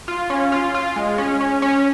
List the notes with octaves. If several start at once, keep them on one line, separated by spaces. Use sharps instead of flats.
F4
C#4
F4
F4
G#3
C#4
C#4
C#4